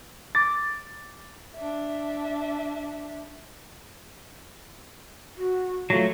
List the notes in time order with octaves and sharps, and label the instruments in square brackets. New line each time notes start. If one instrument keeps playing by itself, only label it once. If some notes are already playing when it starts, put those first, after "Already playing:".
[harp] D6 [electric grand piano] A6
[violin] D4 E5
[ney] F#4
[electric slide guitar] F#3 A3 [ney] F4